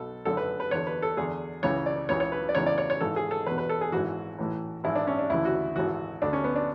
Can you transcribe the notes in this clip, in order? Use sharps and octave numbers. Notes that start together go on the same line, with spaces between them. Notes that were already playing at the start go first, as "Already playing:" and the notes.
Already playing: B1 B2 A4
G#1 F#2 D3 A4
B4
B4
E2 D3 C#5
B4
A4
E2 D3 G#4
C#2 C#3 E3 C#5
D5
C#2 C#3 E3 C#5
C#5
B4
D5
E2 C#3 E3 C#5
D5
C#5
C#5
G#1 G#2 E3 A4
G#4
A4
E2 B2 B4
B4
A4
G#4
G#1 G#2 E3 F#4
A1 A2 E3
G#1 G#2 E3 E4
D4
C#4
D4
D2 C#3 E3 E4
F#4
G#1 G#2 E3 F#4
D2 D3 D4
C#4
B3
D4